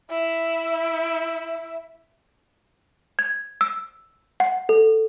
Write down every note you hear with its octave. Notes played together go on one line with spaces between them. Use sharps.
E4 E5
G#6
E6
F#5
A4